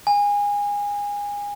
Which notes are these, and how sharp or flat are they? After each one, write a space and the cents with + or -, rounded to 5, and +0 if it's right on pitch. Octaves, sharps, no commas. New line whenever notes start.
G#5 -25